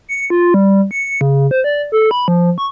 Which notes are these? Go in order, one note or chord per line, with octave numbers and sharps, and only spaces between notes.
C#7
F4
G3
C#7
C#3
C5
D5
A4
B5
F3
C#6